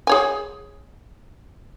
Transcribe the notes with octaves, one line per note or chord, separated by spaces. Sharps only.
G#4 C#5 G#5